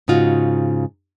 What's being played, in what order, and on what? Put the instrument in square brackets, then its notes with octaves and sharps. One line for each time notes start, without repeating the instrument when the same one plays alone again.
[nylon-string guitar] G#2 C#3 D#4 F4 F#4